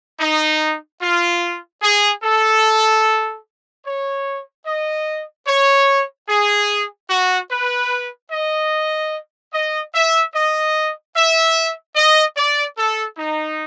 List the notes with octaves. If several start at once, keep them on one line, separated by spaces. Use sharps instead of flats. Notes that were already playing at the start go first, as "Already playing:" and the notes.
D#4
F4
G#4
A4
C#5
D#5
C#5
G#4
F#4
B4
D#5
D#5
E5
D#5
E5
D#5
D5
A4
D#4